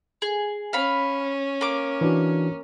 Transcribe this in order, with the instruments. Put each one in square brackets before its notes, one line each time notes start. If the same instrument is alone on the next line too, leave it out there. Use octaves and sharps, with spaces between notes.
[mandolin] G#4
[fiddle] C#4 [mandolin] F5 B5
[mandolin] A#3 D6
[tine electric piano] E3 D4 F#4